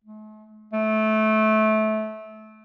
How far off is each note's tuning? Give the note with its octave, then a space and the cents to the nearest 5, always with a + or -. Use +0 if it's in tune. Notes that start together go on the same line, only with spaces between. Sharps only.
A3 -45
A3 -20